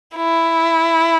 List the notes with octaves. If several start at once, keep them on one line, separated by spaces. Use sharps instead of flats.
E4